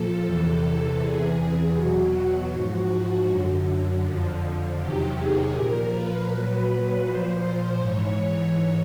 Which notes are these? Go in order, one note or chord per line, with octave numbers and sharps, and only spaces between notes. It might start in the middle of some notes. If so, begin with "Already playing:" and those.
Already playing: A#2 F3 A4
E2 C3 E3 A4
E2 C3 E3 G#4
E2 B2 F#3 F#4
G#2 F3
F#2 D3 F#3
F2 D3 F3
E2 C3 D#3 F#3 G4
G#4
A#2 F3 A#4
B4
A#2 F#3 B4
A#2 F3 C5
C5
G#2 E3 C#5